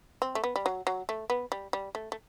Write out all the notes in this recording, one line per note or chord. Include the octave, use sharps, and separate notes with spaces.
C4
A3
B3
G3
F#3
F#3
A3
B3
G3
G3
A3
A3